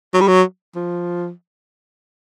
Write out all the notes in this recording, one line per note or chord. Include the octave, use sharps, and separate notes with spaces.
F#3
G3
F#3
F3